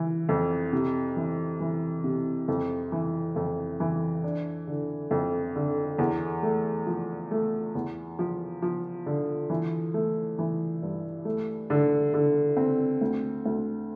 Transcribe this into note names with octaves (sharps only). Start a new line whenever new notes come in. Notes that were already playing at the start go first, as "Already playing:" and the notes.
Already playing: E3
F2
C3
E3
E3
C3
F2
E3
F2
E3
D4
D3
F2
D3
E2
A3
F3
A3
E2
F3
F3
D3
E3
A3
E3
G2
A3
D3
D3
C4
D2
D2